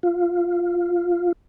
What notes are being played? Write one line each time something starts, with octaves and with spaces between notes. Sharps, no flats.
F4